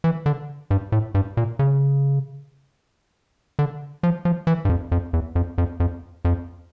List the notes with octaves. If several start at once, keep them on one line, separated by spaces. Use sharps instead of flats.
E3
D3
G2
A2
G2
A#2
C#3
D3
F3
F3
E3
G2
F2
F2
E2
F2
F2
F2
F2